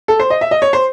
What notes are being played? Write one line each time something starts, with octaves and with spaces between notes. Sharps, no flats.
A4
C5
D#5
E5
D#5
C#5
C5